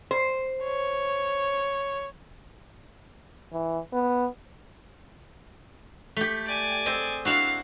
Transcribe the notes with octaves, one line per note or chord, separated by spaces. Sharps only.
C5
C#5
E3
B3
A3 G4
D5 G#5
C4 G#4 D#5
D4 E4 F#4 F5